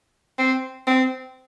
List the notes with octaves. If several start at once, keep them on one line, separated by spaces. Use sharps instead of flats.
C4
C4